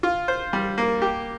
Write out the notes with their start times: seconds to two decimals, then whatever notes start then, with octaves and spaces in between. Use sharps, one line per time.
0.03 F4
0.28 C5
0.53 G3
0.78 A#3
1.02 G4